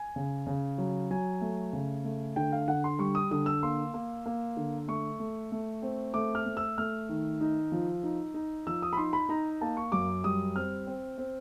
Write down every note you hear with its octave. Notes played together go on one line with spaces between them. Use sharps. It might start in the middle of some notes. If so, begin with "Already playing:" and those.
Already playing: G#5
C#3
C#3
F#3
F#3 G#5
A3
C#3
A3
D3 G5
F5
D3 F#5
C6
G3 C#6
D#6
D3 D#6
E6
A#3 C6
A#3
A#3
D3
A3 C#6
A3
A3
C4
A3 D6
F6
A3
E6
A3 F6
D#3
D#4
F3
D#4
D#4
F3 E6
D#6
B5
D#4 C6
B5
D#4 A#5
A#3 A5
C#6
F#2 D6
G3 D#6
C4 F6
C4
C4